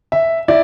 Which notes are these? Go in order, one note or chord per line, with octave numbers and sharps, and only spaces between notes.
E5
E4 D5